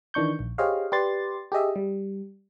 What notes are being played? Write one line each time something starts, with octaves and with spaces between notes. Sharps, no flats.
D#3 E3 D4 C#6 G6
A#1
G4 G#4 C5 C#5 D#5 F5
G4 B4 D5 C6 A6
G4 G#4 D#5 E5
G3